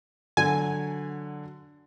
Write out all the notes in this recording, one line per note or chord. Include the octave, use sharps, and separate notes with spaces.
D3 F#3 G#5